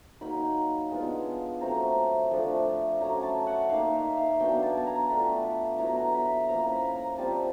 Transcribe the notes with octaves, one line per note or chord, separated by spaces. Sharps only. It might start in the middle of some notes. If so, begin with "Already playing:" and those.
F#3 A#3 D#4 B5
G#3 B3 D4 F4
F#3 A3 C4 A#5
F3 A3 D4
F#3 A3 C#4 A#5
A5
F#5
A#3 D#4 F5
E5
F5
F#3 B3 D4 G5
A5
G#5
A5
A#5
A3 D4 F4 B5
F#3 B3 E4 A#5
A#5
B5
A#5
F3 A#3 C#4 A#5
B5
A#5
G3 C4 F4 A5